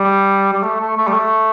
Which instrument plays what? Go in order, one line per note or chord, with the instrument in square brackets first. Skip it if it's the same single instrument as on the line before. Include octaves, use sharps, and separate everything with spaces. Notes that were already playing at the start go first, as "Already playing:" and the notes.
Already playing: [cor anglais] G3
G3
A3
A3
A3
G3
A3